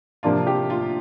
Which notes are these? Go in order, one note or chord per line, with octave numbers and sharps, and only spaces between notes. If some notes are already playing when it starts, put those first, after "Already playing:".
C3 F3 A#3 D4 F4
G4
F4